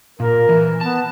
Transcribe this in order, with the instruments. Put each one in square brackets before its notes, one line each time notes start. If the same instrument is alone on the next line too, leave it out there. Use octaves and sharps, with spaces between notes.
[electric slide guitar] A#2 [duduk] A#4
[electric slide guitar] E3
[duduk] B3 [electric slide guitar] A5